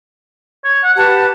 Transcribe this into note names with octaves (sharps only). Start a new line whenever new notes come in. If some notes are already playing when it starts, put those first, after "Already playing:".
C#5
F#5
G4 B4 A5